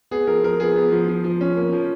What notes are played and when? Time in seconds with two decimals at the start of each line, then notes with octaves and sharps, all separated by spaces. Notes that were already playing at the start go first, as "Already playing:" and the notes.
0.11 B3 G#4
0.27 F3 A#4
0.43 F3 A#4
0.60 B3 G#4
0.76 B3
0.92 F3
1.08 F3
1.24 F3
1.41 C#4
1.57 A#3
1.73 F3